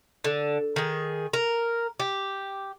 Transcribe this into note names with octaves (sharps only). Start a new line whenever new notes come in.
D3
D#3 G#4
A#4
G4